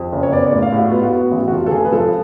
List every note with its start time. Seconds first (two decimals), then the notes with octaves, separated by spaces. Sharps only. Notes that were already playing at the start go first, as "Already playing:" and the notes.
Already playing: F2
0.12 F#1
0.23 C#5
0.32 B3 D5
0.47 A2 D5
0.62 F5
0.72 A2
0.78 F#4
0.90 B3 F4
1.02 F#4
1.13 B3
1.32 A1
1.48 F#4
1.52 F1 F4
1.66 A4
1.71 F1 G#4
1.85 B4
1.93 F3 A4